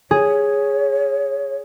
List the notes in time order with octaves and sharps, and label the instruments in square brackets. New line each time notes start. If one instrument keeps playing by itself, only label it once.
[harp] G#4 [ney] C#5